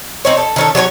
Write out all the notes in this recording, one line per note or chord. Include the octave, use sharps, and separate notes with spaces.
C4 D#4 C#5
A4
D#3 C#4 A4
F#3 C#4 B4 C#5